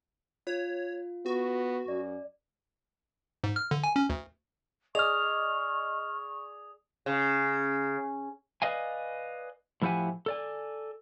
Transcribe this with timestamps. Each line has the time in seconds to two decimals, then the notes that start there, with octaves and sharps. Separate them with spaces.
0.47 F4 C#5
1.26 B3 F#4
1.88 F#2 D5
3.44 G#2
3.56 F6
3.71 D3
3.84 G#5
3.96 C#4
4.10 D2
4.95 G#4 D5 D#5 C#6 D#6 F6 F7
7.06 C#3
8.62 B4 D5 D#5 F5 G#5
9.82 A2 F3 E4 G4 F#5 G#5
10.26 A4 D5 G#5